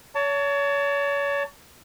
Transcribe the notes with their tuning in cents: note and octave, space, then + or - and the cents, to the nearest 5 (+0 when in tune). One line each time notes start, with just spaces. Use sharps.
C#5 +35 A5 +30